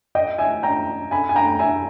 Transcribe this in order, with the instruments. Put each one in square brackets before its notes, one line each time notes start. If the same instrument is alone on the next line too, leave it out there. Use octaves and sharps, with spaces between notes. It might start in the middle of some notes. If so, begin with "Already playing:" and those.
[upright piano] D#5 G5
E5 G#5
G5 A#5
G#5 B5
G#5
G5 A#5
E5 G#5